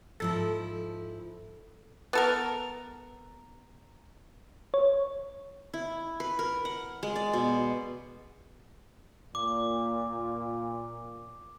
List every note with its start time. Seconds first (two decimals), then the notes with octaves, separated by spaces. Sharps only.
0.20 G#2 F3 E4 A4
2.13 B3 A4 A#4
4.74 C#5
5.74 E4
6.20 B4
6.39 A#4
6.65 F#5
7.03 G#3
7.16 D5
7.33 B2
9.35 A#2 D6